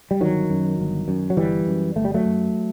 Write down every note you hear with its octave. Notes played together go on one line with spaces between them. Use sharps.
G3
G1 D#3 F#3
F#2
G1
F#2
F#3
G1 E3 G3
F#2
G1 A3
G3
F#3 A3
F#2